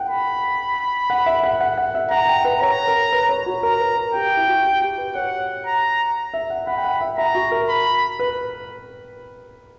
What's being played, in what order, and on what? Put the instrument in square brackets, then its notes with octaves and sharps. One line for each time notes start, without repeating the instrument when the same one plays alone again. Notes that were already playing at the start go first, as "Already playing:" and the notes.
Already playing: [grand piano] F#5 G5
[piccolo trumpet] B5
[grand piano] F#5
E5
F#5
F#5
F#5
E5
[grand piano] F#5 [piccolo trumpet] A#5
[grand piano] G5
B4
[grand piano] C#5 [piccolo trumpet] A#5
[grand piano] A#4
B4
C#5
F#4
[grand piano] A#4 [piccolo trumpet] A#5
[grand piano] B4
A#4
[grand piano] G4 [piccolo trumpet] G5
[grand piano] E4
F#4
F#4
G4
B4
[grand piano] C#5 [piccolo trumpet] F#5
[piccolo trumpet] A#5
[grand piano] E5
F#5
[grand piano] F#5 [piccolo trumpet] B5
[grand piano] G5
F#5
E5
[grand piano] E5 [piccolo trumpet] A#5
[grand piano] F#4
A#4
[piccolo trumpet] B5
[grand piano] B4